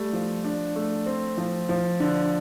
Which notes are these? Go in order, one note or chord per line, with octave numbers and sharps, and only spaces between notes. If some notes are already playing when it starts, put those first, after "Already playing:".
Already playing: G3 A3
F3
D4
A3
C4
F3
F3
D3